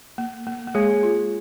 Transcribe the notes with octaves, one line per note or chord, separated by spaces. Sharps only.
A#3
A#3
A#3
G#3 G#4 C#5 G#5
F4